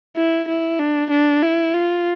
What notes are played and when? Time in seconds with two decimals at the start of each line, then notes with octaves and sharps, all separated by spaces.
0.17 E4
0.49 E4
0.80 D4
1.11 D4
1.43 E4
1.74 F4